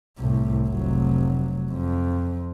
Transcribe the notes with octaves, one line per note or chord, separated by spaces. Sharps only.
C2 A2
F1 F#3
F2